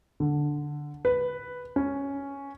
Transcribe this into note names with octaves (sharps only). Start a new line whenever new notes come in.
D3
B4
C#4